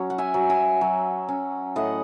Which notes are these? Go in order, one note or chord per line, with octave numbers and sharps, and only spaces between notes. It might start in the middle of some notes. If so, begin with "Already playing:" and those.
Already playing: F#3 C#4 C#5
F#5
E5 G#5
F#3
E5 G#5
F#3
C#4
A2 D#5 F#5